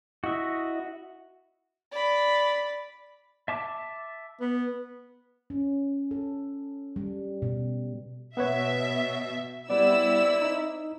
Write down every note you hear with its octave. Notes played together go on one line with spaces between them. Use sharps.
E4 F#4 D#5 E5
D5 B5
E5 A5 D6
B3
C#4
A4
G3
B2
B2 B3 B4 C#5 E5
G3 B3 C4 E4 D5 E6
D#4